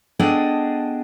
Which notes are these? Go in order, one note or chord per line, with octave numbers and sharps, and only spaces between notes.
B3 D4 G#4 A4 D#5 G5